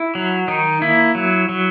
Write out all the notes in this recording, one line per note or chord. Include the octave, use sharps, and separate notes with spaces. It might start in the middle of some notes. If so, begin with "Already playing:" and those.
Already playing: E4
F#3
D#3 D#4
A#3 E4
F#3
F#3